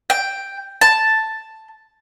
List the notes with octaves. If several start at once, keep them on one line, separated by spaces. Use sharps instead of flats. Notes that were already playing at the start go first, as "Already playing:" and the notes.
G5
A5